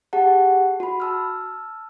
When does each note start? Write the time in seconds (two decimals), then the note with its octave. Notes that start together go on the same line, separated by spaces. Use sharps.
0.13 G4 G#4 F#5 A5
0.80 F#4 B5
1.00 A5 E6 F6